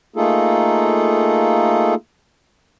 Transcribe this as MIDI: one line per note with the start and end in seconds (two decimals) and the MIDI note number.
0.16 1.95 57
0.16 1.95 58
0.16 1.95 63
0.16 1.95 65
0.16 1.95 68
0.16 1.95 69